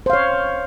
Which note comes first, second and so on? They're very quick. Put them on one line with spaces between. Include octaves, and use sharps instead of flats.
C5 F5 C#5